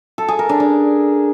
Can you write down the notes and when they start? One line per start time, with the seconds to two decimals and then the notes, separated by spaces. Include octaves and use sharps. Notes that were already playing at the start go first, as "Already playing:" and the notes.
0.18 A4
0.28 G#4
0.39 A#4
0.49 D4
0.60 D4